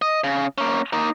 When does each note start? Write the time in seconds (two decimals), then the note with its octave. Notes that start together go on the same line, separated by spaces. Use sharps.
0.02 D#5
0.24 C#3
0.58 A#3 C#4
0.93 A#3 D#4